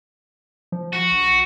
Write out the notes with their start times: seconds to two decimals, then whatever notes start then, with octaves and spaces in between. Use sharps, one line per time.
0.72 F3
0.93 F#4
1.12 A#1